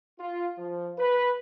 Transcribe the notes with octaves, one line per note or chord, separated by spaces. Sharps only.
F4
F3
B4